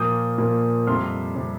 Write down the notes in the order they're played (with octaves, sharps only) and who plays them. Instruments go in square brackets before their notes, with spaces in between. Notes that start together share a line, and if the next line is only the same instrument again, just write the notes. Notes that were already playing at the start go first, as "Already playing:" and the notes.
Already playing: [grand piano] A#2 F3 A#3 D#6 G6
A#2 F3 A#3
F2 C3 G3 C6 F6
C3 G3